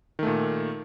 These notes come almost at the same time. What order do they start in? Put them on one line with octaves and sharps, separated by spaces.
D#3 A3 A#2